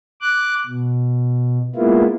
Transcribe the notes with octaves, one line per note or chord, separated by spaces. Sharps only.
D6 F#6
B2
G#3 A#3 B3 E4 F4